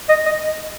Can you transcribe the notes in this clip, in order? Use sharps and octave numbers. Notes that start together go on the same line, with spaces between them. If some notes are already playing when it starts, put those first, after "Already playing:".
D#5
D#5